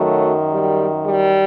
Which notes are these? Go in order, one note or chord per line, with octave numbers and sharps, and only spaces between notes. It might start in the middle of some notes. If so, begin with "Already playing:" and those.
Already playing: F#2 D#3 F#3 A3
G3
G3